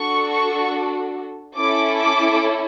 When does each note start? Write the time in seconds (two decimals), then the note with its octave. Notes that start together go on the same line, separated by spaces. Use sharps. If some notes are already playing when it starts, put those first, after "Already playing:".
Already playing: D4 F#4 A4 C#6
0.31 C#6
1.57 C#4 E4 A4 D6
1.99 D6